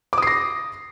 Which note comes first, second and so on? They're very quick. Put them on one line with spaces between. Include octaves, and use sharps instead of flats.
D6 D#6 C7 A#6